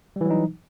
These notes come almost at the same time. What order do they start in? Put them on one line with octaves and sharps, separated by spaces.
G3 E3 F#3 D#4